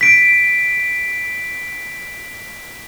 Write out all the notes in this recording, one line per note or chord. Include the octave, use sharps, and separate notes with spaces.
B6 D7